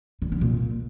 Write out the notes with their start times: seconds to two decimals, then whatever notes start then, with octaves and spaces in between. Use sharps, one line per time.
0.22 D3
0.32 D3
0.41 A#2